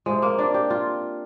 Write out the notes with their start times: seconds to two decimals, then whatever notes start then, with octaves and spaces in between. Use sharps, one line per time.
0.06 C3 F3 G#3
0.22 A#3
0.39 D4
0.54 G4
0.70 F4